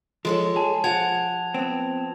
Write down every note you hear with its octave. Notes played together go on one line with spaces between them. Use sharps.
F3 G#3 A4 C#5
G#4 A5
F3 F#5 A5 G#6 F7
B3 C4